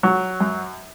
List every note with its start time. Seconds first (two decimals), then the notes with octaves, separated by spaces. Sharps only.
0.03 F#3
0.40 F#2